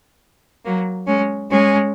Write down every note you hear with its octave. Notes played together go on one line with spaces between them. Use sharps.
F#3 A#3
G#3 C#4
G#3 C#4